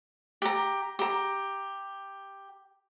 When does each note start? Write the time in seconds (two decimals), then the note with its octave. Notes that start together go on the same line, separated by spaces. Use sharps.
0.42 G4 A#5
0.99 G4 A#5